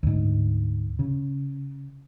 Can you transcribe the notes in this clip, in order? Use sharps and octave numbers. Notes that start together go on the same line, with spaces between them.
D2 G#2
C#3